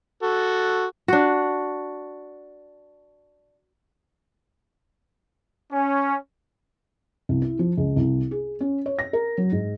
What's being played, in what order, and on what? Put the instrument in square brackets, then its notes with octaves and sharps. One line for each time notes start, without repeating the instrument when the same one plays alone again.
[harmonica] F#4 A4
[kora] D4 F#4
[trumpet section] C#4
[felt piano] C2
E4
F3
C#2
C2
G#4
C#4
C#5
A#6
A#4
F#3
G#2